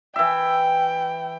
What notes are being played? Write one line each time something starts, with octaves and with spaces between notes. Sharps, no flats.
E3 E5 G5